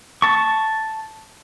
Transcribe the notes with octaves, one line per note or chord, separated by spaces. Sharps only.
A5 C#6